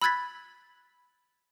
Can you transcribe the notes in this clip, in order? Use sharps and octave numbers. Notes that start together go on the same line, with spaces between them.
B5 E6 F#6 G#6 A6 B6